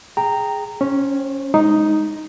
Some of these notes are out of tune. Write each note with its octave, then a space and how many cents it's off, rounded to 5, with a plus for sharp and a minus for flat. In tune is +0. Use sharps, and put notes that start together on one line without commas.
G#4 +0 G5 +0 A#5 -10
C#4 +0 C5 +35
G#3 +0 D#4 +0